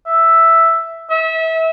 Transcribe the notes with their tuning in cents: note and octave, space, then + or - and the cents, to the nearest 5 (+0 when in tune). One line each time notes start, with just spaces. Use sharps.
E5 +0
E5 -30